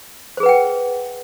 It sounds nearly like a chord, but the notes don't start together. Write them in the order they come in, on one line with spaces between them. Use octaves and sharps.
C5 G#4 B4 F#5 G5